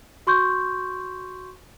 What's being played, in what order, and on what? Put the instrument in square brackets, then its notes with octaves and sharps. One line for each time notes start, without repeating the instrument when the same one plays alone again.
[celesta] F#4 C6 C#6 G6